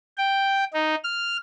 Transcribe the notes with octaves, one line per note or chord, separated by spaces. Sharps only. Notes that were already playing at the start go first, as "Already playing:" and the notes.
G5
D#4
F6